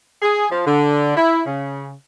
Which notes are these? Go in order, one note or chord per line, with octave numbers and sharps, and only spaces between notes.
G#4
F3
D3
E4
C#3